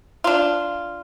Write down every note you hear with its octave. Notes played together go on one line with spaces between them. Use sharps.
D4 F4